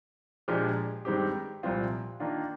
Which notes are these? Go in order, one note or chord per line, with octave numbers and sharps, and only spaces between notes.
A#2 F3 G#3 D4 G4
G2 D#3 G#3 C4 G4
C2 A#2 F3 C4 F4
D#3 A#3 D4 F4